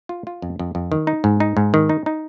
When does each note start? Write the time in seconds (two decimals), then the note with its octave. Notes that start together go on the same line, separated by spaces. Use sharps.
0.09 F4
0.27 F4
0.42 F2
0.59 F2
0.75 F2
0.92 D#3
1.07 D#4
1.24 G#2
1.40 D#4
1.57 G#2
1.74 D#3
1.89 D#4
2.06 D#4